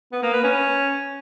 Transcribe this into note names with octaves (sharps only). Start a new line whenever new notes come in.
B3
A#3
B4
C#4